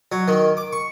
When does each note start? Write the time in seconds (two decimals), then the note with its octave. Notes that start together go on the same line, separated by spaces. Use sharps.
0.12 F#3
0.28 D#3
0.57 D6
0.73 C#6